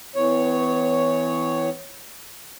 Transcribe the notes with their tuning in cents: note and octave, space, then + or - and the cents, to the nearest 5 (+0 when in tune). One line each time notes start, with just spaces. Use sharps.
E3 +0 B3 +45 C#5 +0